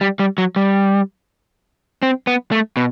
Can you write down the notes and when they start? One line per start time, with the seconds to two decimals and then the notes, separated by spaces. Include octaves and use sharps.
0.01 G3
0.19 G3
0.38 F#3
0.56 G3
2.03 C4
2.27 B3
2.52 A3
2.77 B2